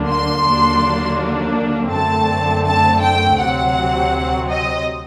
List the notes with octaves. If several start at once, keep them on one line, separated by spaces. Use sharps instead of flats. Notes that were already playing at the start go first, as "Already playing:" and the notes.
Already playing: D2 D3 F#3 A#3 D4
C6
D#2 D3 F#3 A#3 D4
F#2 D3 A3 C4 A5
A5
G5
D2 C3 F#3 C4 F#5
D#5